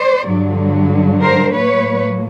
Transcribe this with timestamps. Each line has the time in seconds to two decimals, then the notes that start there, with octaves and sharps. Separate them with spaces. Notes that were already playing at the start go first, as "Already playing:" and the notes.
Already playing: C5 D5
0.23 G2 D3 F#3
1.21 A#4 C5
1.54 A2 F#3 A#3 B4 C#5